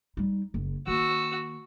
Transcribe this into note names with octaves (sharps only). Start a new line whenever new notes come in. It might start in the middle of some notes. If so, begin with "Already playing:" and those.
G3 D#4
F#1
D#3 A#3 F#4 E6